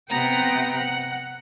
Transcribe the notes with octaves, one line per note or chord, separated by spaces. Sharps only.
C3 B3 F#5 G5 A#5 D#6
F#5 F#6